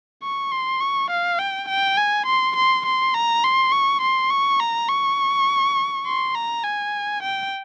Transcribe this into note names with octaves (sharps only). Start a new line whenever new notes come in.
C#6
C6
C#6
F5
G5
G5
G#5
C6
C6
C6
A#5
C6
C#6
C6
C#6
A#5
C#6
C6
A#5
G#5
G5